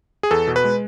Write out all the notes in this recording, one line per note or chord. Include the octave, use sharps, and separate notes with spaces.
G#4
E2 A4
B2
B4
G#3